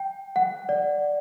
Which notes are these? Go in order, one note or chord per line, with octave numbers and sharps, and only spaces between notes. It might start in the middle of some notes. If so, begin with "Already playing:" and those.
Already playing: G5
F#5
D5